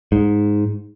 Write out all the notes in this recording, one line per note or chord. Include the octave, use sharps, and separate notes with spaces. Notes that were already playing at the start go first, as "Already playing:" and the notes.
G#2